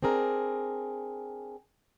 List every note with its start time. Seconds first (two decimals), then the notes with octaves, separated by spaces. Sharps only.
0.03 C4 D4 G#4 A#4